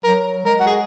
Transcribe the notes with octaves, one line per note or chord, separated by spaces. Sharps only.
F#3 A#4
G#3 A#4
F#4
G#4